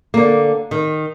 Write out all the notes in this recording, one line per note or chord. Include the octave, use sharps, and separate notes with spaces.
D3 A#3
D#3